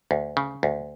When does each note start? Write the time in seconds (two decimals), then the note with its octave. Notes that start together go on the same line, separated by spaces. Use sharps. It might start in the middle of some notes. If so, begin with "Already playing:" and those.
0.11 D2
0.37 C#3
0.63 D2